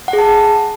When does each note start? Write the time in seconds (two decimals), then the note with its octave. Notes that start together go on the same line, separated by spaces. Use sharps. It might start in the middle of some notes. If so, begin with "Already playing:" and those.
0.08 F#5
0.13 G#4
0.18 A5